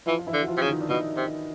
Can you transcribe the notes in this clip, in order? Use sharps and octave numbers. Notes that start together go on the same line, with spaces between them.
E3 F3 F4
F4
E3 E4
D3
F#4
F3 F4
C3
C#3
D#3 D#4
D4
B2 D#3 D#4
C3